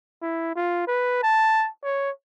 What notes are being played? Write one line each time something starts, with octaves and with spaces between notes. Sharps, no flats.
E4
F4
B4
A5
C#5